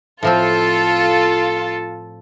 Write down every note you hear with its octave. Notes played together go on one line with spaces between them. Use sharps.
A2 F3 C4 F4 A4